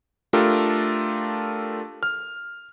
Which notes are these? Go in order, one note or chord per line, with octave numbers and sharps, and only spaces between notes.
A3 D4 F4 G4 A4 A#4
F6